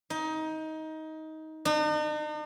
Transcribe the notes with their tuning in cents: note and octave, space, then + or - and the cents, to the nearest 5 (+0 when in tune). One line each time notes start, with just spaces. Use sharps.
D#4 +20
D#4 -45